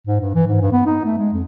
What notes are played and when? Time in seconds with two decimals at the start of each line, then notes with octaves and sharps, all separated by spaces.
0.07 G#2
0.21 G2
0.35 E3
0.47 G#2
0.61 G2
0.72 B3
0.86 D#4
1.05 A3
1.19 G#3
1.33 F2